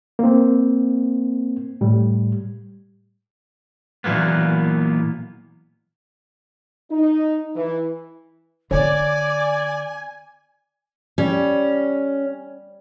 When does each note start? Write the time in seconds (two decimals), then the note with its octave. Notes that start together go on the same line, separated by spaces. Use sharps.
0.19 A#3 C4
1.81 A2 G3
4.04 A#2 E3 F#3 A#3 B3
6.91 D#4
7.56 E3
8.71 D3 B3 C#5 D5 G#5
11.18 G3 C#4